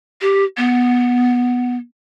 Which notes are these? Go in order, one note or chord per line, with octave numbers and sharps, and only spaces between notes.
G4
B3